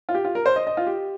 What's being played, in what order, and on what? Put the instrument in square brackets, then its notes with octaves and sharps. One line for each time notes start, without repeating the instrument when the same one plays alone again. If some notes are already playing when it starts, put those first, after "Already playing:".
[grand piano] F4
G4
F4
A#4
C5
D#5
D#5
F4
G4